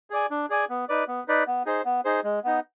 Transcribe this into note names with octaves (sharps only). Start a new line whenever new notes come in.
G#4 D5 G#5
D4
G#4 D5 G#5
B3
D#4 B4 D5
B3
D#4 B4 D5
B3
D#4 G#4 C5
B3
D#4 G#4 C5
G#3
B3 D#4